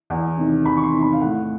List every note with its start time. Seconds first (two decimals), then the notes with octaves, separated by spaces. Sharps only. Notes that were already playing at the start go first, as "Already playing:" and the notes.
0.10 E2
0.37 C3 D#3
0.65 E2 B5
0.77 C#6
0.84 C6
0.93 C3 D#3
1.02 B5
1.13 F5
1.21 A2 F#5